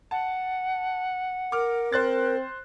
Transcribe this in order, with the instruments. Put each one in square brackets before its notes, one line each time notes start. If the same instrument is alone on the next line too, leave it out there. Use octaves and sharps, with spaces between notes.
[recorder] F#5 [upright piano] A5
[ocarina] A#4 [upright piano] D6 F6
[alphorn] C4 [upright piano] C5 F#6 A6